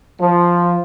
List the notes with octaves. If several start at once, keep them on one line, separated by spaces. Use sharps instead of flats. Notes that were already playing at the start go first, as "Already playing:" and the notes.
F3